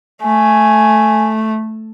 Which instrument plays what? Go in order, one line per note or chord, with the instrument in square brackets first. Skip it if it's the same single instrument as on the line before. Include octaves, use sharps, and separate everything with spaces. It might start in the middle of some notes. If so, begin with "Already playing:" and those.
[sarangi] A3 [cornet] G#5